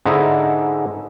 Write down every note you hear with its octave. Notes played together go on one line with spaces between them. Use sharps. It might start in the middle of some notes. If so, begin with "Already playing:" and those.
G#2 D3 G#3 D#4 E4